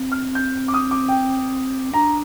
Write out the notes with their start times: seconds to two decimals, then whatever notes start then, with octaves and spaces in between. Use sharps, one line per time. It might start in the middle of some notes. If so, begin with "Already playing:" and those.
Already playing: C4
0.12 F6
0.35 G6
0.68 D6
0.74 D#6
0.91 D6
1.08 G5
1.93 D4 A#5